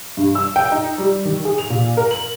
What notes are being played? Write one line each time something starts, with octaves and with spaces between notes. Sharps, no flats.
G2
E6
G5
D#4
G3
D#3
G#4
F7
A#2
A#4
F#7